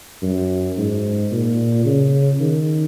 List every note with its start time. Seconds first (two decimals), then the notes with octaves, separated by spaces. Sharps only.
0.23 F#2
0.78 G#2
1.32 A#2
1.86 C#3
2.40 D#3